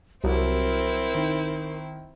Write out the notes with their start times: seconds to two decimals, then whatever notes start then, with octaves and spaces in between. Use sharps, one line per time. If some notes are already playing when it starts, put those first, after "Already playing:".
0.24 C2 F#3 C4 E4 A#4
1.14 D#3